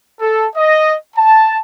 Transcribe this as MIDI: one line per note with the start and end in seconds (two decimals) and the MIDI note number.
0.20 0.46 69
0.55 0.94 75
1.16 1.58 81